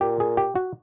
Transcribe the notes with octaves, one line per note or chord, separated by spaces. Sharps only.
A#2 G4
G#4
G4
F#4